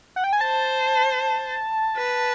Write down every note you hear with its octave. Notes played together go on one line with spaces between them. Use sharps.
F#5
G5
G#5
C5 A5
B4